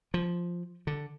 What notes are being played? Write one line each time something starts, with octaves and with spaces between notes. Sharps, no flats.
F3
D3